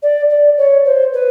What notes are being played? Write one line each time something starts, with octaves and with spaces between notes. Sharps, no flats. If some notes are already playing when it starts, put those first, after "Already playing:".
D5
D5
C#5
C5
B4